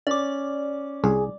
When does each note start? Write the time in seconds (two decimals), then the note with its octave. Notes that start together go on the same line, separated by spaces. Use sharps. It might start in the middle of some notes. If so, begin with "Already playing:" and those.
0.07 C#4 D5 D6
1.04 C2 G#4